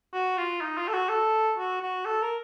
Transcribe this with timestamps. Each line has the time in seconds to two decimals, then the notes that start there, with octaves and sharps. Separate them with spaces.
0.13 F#4
0.38 F4
0.61 D#4
0.78 F4
0.88 A4
0.94 F#4
1.09 A4
1.58 F#4
1.82 F#4
2.05 A4
2.22 A#4